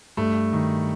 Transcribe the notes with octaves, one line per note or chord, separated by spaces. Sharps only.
G2 A3
D#3